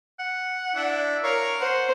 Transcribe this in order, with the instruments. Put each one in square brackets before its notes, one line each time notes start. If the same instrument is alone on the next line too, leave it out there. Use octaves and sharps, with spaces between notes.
[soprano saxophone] F#5
[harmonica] D4 E4
[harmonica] A#4 F5 [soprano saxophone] C#5
[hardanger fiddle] C5 [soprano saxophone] F#5